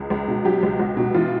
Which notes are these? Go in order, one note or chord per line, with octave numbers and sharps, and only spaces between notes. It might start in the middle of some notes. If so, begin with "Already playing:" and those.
Already playing: C#2 G#4
C#2
B2
F#3 G4
C#2
C#2 F#4
B2
E3 F4